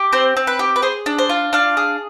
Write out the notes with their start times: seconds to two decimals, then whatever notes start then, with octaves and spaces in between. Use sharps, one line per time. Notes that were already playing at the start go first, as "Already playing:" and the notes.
Already playing: G4
0.13 C4 C5
0.37 C4
0.47 B4
0.59 G4
0.76 B4
0.82 G#4 C5
1.06 D4
1.19 C5
1.29 F4
1.53 D4 F5
1.77 G#4